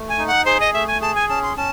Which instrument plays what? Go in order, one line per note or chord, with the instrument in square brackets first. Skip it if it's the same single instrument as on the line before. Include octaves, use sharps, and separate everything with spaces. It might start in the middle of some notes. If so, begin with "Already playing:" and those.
Already playing: [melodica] A3
[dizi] G#5
[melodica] D#4
[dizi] F#5
[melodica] G#4 [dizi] C5
[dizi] D#5
[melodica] A3 [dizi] E5
[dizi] G#5
[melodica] G#4 [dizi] A5
[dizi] G#5
[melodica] C#4 [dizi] A5
[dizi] C6
[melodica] C#4 [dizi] A5